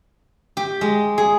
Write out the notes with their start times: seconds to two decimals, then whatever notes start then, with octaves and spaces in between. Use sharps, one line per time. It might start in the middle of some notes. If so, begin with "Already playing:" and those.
0.57 G4
0.81 G#3
1.18 G#4